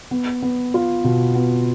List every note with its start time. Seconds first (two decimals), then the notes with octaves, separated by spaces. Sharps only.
0.11 B3
0.42 B3
0.74 F4
1.04 B2
1.35 B3